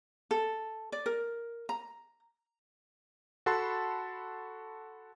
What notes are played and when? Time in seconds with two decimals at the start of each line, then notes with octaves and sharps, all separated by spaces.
0.31 A4
0.92 D5
1.06 A#4
1.69 A#5
3.46 F#4 A4 F#5 A5 B5 C6